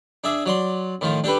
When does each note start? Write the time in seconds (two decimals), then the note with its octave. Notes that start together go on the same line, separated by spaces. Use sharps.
0.24 D4 G#4 E5
0.46 F#3 D5 C6
1.01 A2 D#3 F3 F4
1.24 D4 G4 A4 B4